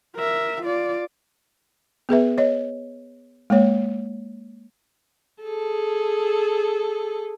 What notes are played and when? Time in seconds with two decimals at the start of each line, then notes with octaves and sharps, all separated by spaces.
0.16 A#4 E5
0.63 F4 D5
2.09 B3 G#4 B4 E5
2.38 C#5 D#5
3.50 G#3 A#3 C#5
5.43 G#4 A4